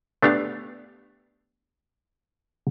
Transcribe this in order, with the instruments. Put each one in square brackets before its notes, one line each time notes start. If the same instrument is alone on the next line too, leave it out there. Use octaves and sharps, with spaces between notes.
[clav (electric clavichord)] A3 B3 D4 G4 F5